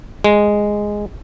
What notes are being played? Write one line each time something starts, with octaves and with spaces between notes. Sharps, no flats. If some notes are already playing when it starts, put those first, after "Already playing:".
G#3